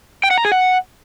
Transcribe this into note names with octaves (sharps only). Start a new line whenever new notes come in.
G5
F#5
A#5
G#4
F#5